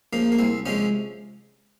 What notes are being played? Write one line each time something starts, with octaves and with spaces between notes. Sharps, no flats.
C#3 F3 A#3
A#3
C2 C4
C3 F3 G#3 C#4